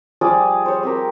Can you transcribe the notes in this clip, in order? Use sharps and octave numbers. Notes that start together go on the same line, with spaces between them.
F3 G3 G#4 D5
C5 C#5
C4 G4 A#4